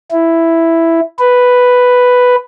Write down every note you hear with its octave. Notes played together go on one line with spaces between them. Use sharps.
E4
B4